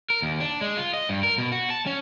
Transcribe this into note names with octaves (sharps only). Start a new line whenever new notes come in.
A#4
D#2
D4
G#3
F4
D#5
G2
A#4
B2
F#4
A5
C#4